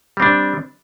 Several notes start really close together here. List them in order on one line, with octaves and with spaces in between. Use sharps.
G3 C4 D4